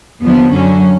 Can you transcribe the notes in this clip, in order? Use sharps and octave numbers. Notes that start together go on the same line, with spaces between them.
D#2 D3 F3 B3
F#2 D3 F#3 C#4